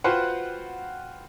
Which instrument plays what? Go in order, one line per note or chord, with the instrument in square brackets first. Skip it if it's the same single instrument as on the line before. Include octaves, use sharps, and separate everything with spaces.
[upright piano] F4 F#4 B4 C5 F#5 G5